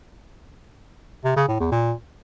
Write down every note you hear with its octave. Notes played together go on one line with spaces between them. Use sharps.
C3
C#3
A2
E2
A#2